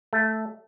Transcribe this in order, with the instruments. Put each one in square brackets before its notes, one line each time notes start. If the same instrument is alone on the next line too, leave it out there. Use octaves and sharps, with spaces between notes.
[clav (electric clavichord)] A3